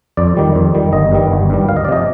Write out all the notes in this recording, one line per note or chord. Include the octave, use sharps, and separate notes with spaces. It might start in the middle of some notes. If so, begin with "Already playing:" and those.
F2 D5
D#3 G3
F2
D#3 G3
G1 D#5
G2 D#3 G3
G1
G2 D#3 G3
D2 F5
D#5
D5
C3 F3 D#5